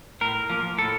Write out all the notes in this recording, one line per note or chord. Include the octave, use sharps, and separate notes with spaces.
A2 A#4
F3 A#3
A2 A4